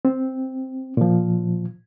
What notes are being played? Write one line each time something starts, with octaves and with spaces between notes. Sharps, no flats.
C4
A#2 F3